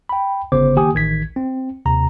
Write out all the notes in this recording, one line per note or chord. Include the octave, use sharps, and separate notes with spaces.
G5 B5
G1 C#3 B3 C5 D6
D#3 A#3 G4 G#5 D#6
A1 D#3 G#6 B6
C4
D#2 C3 A#5